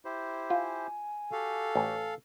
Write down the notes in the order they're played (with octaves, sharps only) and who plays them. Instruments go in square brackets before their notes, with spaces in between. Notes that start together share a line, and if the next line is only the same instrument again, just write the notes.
[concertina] E4 G4 C5
[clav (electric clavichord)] F4 [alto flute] G#5
[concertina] F#4 G4 [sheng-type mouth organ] A4 F5
[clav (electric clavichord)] A1